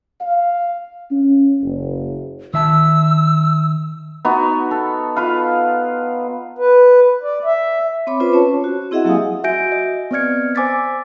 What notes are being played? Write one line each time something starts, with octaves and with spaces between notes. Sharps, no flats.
F5
C#4
F#1
D#3 E5 A5 E6
B3 D#4 F#4
A4
F4 B4 F5
B4
D5
E5
C4 C#5 B5 D6
C#4 F4 B4 C5
C#4 C#5 A5 C#6
F#4
C4 E4 G#4 D#5 E5 F#5
F#3 A#3 G4 F5 G#5 D#6
F#4 E5 G#5 G6 A#6 D7
D#5
B3 C4 D5 F6 G#6 C#7
C5 G#5 D6 E6 A6 B6